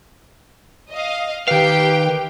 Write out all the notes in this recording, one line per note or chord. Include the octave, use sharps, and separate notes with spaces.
D#5 F5
D#3 G4 B4 F5 G5